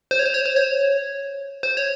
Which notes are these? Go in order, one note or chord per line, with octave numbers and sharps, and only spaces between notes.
C5
C#5
C5
C#5
C5
C#5
C5
C#5